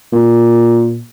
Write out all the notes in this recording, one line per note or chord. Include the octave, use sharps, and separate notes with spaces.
A#2